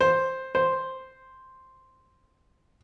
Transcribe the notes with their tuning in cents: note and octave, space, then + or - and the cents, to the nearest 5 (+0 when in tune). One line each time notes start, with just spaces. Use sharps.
C5 +5
C5 +0